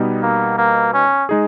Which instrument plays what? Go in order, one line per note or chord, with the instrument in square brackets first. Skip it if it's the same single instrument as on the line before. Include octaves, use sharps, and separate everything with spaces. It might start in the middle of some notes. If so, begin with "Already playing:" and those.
Already playing: [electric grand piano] B2 G3 B3 D#4
[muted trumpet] A#3
A#3
C#4
[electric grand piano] G#3 D#4 G#4